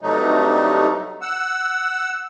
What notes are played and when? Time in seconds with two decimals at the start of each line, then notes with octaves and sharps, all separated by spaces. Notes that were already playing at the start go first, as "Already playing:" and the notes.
0.01 G2 C3 F#3 A3 D#4
1.22 F#5 E6